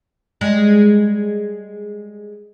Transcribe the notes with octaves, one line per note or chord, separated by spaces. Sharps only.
G3 G#3